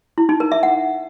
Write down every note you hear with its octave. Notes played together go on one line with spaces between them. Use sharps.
E4
D#4
A#4
E5
F#5